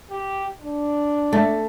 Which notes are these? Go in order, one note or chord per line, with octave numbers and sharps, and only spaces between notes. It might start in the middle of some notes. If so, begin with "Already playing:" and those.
G4
D4
A3